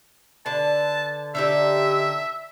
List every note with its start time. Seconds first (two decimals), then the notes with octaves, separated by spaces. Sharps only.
0.46 D3 B4 A5
1.35 D3 D#4 G4 E5